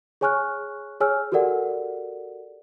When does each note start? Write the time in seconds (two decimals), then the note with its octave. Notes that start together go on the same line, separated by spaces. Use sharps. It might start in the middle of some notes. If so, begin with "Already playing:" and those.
0.21 G#4 C#5 G#5 C#6 F6 F#6
1.00 G#4 C#5 G#5 E6 F6
1.32 F#4 G4 A4 A#4 D5 F#5